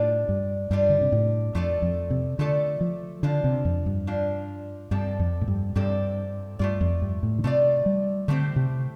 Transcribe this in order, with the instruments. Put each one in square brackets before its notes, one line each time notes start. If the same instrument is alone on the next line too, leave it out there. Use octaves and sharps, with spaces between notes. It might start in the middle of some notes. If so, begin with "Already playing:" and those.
Already playing: [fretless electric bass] A2 [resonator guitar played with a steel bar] G3 D4 F4 D5
[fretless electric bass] G2
[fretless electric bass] G2 [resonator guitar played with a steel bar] G3 D4 F4 D5
[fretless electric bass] D3
C3
A2
[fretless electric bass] F2 [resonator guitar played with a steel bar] A3 F4 A4 D5
[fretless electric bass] F2
C3
[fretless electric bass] D3 [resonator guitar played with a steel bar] A3 F4 A4 D5
[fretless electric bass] F3
[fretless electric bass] D3 [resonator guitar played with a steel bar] F3 D4 F4
[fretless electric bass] C3
F2
G2
[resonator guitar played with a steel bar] F3 D4 F4
[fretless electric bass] G2 [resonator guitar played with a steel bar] C3 F3 C4 A4 D5
[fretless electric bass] F2
A2
G2
[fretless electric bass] G2 [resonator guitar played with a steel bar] C3 F3 C4 A4 D5
[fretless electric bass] G2 [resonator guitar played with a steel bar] A3 F4 D5
[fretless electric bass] F2
G2
A2
D3
[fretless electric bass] C3 [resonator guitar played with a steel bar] A3 F4 D5
[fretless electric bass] G3
[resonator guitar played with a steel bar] A2 A3 C4 G4 C5 [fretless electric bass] D3
[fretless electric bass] C3